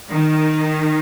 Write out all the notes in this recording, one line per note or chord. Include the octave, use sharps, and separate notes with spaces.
D#3